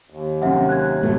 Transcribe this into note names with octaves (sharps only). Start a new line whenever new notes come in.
D#2
F#2 C3 C4 E5 F#5
F#6 G#6
G#2 B2 A3